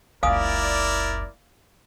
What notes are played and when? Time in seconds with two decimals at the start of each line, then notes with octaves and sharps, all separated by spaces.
0.23 F#1 C#2 E4 A#4 D5 F5 G#5 D#6